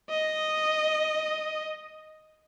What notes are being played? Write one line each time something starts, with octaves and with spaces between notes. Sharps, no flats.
D#5